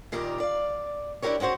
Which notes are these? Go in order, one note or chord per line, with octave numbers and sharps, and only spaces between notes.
A#2 D#3 G3 G4 A#4
D5 F5
D4 E4 F4 G4 A#4 C#5
G#3 C#4 F#4 C5 C#5